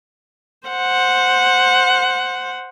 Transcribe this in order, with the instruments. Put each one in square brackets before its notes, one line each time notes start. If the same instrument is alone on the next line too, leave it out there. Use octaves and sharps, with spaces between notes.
[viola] C5 F#5